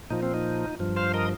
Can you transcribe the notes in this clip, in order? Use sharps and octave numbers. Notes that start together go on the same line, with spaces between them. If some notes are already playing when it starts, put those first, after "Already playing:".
A#2 F3 D#4
C4
D#4
G2 F3
C5 F5
A#4 D#5